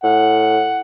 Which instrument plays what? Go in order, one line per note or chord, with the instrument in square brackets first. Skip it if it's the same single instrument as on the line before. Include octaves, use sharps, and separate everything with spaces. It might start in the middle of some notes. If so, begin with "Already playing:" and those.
[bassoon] A2 [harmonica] F#5